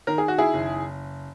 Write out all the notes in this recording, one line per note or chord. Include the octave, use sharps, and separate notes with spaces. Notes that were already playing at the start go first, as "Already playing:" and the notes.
D#3 A#4
G#4
F#4
E4 G#4
F#1